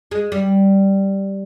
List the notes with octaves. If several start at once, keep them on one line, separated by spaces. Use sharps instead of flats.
G#3
G3